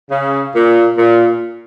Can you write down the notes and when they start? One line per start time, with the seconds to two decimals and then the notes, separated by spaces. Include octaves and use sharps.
0.11 C#3
0.55 A#2
0.98 A#2